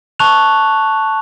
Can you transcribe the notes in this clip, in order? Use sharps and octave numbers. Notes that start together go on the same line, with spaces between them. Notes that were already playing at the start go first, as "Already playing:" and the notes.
A5 C#6 F#6 F7